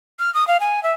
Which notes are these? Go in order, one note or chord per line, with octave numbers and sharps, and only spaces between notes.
F6
D#6
F5
G#5
E5